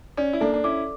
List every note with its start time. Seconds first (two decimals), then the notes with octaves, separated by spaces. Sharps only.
0.17 C#4 D5
0.33 E4
0.41 A#3 D4 A4
0.53 D4
0.64 C#4 E4 D6